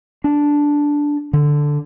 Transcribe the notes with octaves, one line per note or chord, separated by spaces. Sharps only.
D4
D3